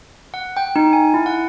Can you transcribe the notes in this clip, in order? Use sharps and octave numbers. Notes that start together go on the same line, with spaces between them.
F#5
G5
D#4
G#5
E4
F#5